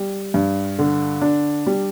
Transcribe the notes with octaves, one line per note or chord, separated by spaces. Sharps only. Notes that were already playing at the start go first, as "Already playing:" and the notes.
Already playing: G3
G2
D3
D4
G3